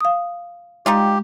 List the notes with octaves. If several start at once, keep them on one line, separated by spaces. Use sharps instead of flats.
F5 D#6
G3 G#3 D#4 F4 G4